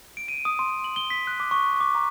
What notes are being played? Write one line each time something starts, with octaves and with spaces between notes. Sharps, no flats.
D7
D#7
D#6
C6
F#7
G7
B6
F#6
D6
C#6
D6
A#5